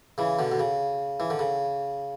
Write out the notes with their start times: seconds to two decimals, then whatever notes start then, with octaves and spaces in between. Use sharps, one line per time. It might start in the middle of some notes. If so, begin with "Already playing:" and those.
0.18 C#3 E3
0.39 B2 D3
0.52 B2
0.59 C#3
1.20 E3
1.30 D3
1.39 C#3